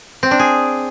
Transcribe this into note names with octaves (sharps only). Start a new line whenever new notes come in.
C4
D4
G#4